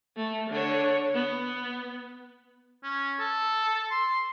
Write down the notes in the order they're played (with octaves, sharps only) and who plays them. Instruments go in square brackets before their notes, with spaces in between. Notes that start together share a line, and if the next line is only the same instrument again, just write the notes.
[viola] A3
D3 C#5
B3
[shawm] C#4
A4
C6